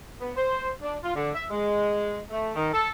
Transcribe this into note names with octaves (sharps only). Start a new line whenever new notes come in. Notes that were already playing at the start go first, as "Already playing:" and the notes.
B3
C5
D4
F4
D3
E5
G#3
A3
D#3
A4